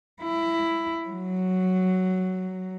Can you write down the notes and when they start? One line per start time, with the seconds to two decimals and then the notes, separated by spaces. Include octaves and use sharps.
0.22 E4
1.09 F#3